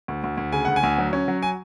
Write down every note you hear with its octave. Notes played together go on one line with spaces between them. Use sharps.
D2
D2
D2
C#3 G#5
D2 F#5
G#5
D2
F#3
C#4
F#3
G#5